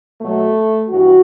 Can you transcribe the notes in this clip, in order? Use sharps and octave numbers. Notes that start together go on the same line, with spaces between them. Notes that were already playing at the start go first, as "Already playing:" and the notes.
B2 F#3 A3
G2 E3 F#4